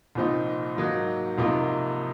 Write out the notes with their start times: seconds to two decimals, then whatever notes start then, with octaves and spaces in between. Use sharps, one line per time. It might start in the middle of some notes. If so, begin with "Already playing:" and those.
0.15 C2 A#2 F3 C4 D#4
0.77 G#2 F#3 A#3 D#4
1.38 C2 C3 F3 A#3 D#4